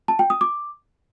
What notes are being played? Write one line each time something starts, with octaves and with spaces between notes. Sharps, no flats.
A5
G5
D#6
D6